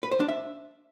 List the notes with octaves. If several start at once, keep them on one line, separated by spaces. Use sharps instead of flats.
B4
C5
D4
E5